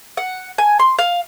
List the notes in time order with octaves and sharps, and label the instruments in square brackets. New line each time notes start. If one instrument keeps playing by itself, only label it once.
[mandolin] F#5
G#5
C6
F5